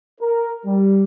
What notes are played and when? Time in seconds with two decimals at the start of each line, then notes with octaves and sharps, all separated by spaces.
0.20 A#4
0.66 G3